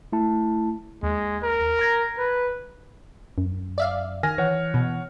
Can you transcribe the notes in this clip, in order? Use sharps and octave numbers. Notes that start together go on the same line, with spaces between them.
A3 E4 A5
D#2 G#3
A#4
A#5 G#6 A#6
B4
F#2
D5 E5 F5
D#3 G#5 F6 A#6
E3 C#5 F#5
B2